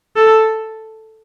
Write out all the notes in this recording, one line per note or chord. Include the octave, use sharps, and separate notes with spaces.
A4